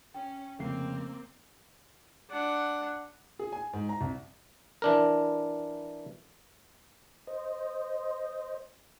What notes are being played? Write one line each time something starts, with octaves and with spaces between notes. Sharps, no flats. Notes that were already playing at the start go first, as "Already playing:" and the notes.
C#4 G5
F1 C#3 A#3 C4 C7
D4 F#5
G#4
G#5
G#2
A#5
C2
E3 D4 A#4
C5 D#5